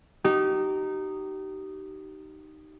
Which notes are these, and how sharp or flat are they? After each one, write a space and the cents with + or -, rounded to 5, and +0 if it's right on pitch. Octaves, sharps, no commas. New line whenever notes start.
D#4 -10 G4 -35